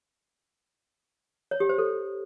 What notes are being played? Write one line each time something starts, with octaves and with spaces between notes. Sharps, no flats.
C#5
G4
C5
A4